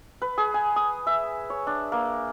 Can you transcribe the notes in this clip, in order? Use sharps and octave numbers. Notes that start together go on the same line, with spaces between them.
B4
G#4
G#5
D#6
E5
C#5
D4
A#3